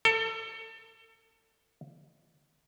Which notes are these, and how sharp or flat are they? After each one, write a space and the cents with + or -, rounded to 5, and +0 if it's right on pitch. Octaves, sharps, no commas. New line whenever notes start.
A4 +30